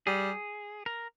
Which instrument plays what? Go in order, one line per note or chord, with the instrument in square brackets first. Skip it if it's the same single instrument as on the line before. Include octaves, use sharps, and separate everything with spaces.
[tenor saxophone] G3 [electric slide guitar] G#4
[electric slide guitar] A#4